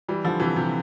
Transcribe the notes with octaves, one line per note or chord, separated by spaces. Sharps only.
E3 G3
D3 F3
C3 E3
C3